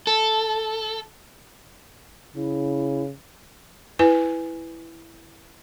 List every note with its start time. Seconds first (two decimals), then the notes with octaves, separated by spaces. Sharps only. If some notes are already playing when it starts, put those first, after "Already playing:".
0.07 A4
2.36 C#3 E4
3.99 E4 B4 G#5